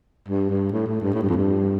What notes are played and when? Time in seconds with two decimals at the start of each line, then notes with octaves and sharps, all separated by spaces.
0.28 G2
0.50 G2
0.72 A2
0.86 A2
1.01 G2
1.14 A2
1.22 G2
1.29 F2
1.37 G2